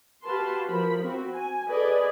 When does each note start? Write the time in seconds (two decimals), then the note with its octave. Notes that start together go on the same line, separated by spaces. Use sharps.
0.24 F#4 G4 B4 F5 A5 C6
0.66 F3 A#4 B5
1.01 C4 F#4
1.33 G#5
1.68 G#4 A4 B4 D5 D#5 G#5